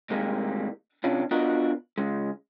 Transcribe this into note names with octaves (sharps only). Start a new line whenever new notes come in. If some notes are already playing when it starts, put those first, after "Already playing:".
A2 C3 D#3 G3 G#3 A#3
C3 C#4 D4 F4
B3 D4 F4 F#4 A#4 D#5
C#3 G#3